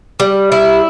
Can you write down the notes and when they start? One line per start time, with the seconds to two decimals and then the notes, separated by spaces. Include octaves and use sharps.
0.20 G3
0.52 E4